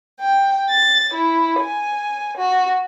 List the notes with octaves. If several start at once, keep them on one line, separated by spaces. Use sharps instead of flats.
G5
A6
E4
G#5
F#4